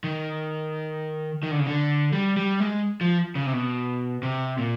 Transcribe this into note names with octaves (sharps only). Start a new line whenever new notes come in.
D#3
D#3
D3
C#3
D3
G3
G3
G#3
F3
C#3
C3
B2
C3
A#2